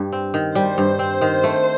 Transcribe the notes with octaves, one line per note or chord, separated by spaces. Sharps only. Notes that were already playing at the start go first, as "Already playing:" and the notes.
Already playing: G2 G3
C4
D#3
G3 C5
G2
C4
D#3
A3